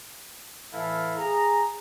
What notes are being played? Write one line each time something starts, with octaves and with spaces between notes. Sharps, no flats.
A2 E3 E4 A4 F5
G#4 A#5